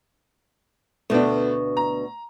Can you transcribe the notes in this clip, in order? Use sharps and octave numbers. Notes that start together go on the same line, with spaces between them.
D2 B2 A3 B3 D4
A#5